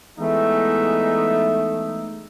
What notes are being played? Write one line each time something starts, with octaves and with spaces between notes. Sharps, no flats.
E3 G#3 A3 B3 D#4 E5